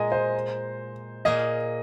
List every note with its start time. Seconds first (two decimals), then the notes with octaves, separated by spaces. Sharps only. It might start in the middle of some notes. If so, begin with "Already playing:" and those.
Already playing: A#2 G#3 G#4 D#5 G#5 A#5
0.12 C5
1.25 A#2 A#3 G#4 D#5